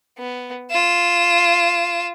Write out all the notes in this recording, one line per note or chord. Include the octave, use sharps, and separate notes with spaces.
B3
F4 E7